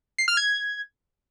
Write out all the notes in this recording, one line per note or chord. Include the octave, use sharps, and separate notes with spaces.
C7
F6
G#6